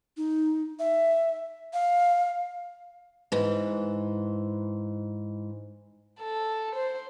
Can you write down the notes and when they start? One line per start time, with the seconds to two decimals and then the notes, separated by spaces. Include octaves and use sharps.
0.17 D#4
0.79 E5
1.73 F5
3.32 G#2 E3
6.20 A4
6.76 C5